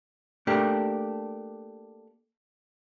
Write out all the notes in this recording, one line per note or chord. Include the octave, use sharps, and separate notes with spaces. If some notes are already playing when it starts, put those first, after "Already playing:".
A3 A#3 D4 G4